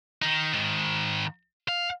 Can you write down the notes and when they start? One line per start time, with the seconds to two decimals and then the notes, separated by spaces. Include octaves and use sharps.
0.22 D#3 D#4
0.53 G#2 D#3
1.68 F5